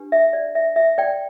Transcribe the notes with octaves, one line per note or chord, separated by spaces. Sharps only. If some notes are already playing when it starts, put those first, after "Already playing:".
Already playing: D4 G4 B4
E5
D5
E5
E5
D5 G5